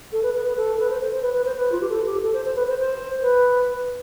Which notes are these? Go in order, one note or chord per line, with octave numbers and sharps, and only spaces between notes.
A4
B4
B4
B4
A4
B4
C5
C5
C5
B4
B4
C5
B4
F4
G4
A4
G4
A4
C5
C5
B4
C5
C5
B4